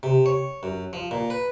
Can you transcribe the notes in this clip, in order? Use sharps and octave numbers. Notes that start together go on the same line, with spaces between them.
C3
C#5
F#2
F3
A#2
B4